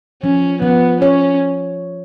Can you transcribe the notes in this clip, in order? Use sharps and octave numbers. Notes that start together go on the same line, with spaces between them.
F3 C#4
F3 B3
C#4 C#5